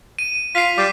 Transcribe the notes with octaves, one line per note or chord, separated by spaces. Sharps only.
D#7
F4 B6 C7
G3 D6